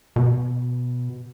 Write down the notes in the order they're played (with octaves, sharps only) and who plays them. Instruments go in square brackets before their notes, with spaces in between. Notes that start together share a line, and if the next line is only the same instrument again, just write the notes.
[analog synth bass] B2